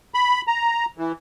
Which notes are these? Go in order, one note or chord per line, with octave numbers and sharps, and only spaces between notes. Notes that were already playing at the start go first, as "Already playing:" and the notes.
B5
A#5
E3